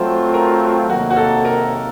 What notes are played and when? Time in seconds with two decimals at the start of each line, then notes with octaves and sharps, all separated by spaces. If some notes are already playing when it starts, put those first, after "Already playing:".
Already playing: F#3 A3 C4 F4 C5
0.34 A#4
0.89 C3 D#3 F#3 A#3 F#4
1.10 F#4
1.16 A4
1.45 A#4